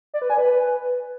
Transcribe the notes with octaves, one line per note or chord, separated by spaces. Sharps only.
D5
B4
G#5
B4